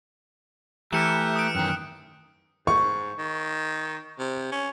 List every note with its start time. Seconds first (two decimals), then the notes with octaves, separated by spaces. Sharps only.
0.93 E3 A3 G4 A#5 F6 F#6 C#7 E7
1.36 D#6 D7
1.55 F#2 D#3 G5 F#6
2.67 G#2 C#6
3.18 D#3
4.19 C3
4.52 C#4